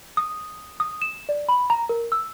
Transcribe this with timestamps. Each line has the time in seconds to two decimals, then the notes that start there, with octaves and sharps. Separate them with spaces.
0.17 D#6
0.80 D#6
1.02 E7
1.29 D5
1.49 B5
1.70 A#5
1.89 A#4
2.12 E6